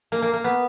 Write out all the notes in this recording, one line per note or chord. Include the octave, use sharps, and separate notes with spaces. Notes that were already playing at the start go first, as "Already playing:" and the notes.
A#3
A#3
A#3
B3